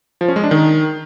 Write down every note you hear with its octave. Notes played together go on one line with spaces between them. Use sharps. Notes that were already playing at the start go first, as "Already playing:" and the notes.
F3
C#4
G#3
D4
D#3